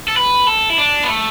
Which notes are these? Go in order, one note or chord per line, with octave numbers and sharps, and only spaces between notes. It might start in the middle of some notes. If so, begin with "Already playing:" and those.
A4
B4
A4
E4
D4
B3
A3